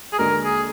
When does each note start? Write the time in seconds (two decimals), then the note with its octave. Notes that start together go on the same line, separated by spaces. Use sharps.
0.12 G#4
0.19 D#2 D3 G#3 D4 F#4 A#4
0.44 G#4